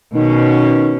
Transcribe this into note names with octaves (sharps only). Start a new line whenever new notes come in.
B2 D#3 C#4